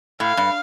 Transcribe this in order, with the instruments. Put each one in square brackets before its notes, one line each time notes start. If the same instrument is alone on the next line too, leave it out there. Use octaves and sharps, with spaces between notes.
[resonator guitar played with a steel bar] A2 [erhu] F5
[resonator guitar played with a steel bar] G2